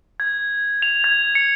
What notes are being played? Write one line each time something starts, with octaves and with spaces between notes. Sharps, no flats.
G#6
F7
G#6
C#7